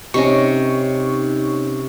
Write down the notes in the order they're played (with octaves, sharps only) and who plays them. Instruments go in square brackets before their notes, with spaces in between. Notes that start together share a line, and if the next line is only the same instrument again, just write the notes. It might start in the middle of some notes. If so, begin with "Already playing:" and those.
[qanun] C3 D#5 [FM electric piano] C#4 D#4 C#6